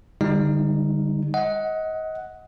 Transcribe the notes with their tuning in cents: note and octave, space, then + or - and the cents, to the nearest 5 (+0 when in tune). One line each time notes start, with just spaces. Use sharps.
D3 +5 G3 +30 D#4 +0
D#5 +25 F#5 +0